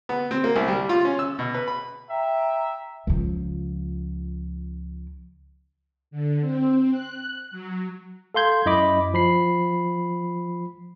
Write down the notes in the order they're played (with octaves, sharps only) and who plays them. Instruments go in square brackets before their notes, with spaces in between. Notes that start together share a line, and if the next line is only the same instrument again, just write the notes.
[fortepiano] B3
C4
A#3
C2
G3
F4
C#4
E6
B2
B4
B5
[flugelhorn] E5 [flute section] G5 A#5
[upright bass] C#2 F3
[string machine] D3
C4
F#6
F#3
[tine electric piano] A4 F5 C6 G6 G#6
F#2 E4 D#5 B5 D6
F3 B5 C7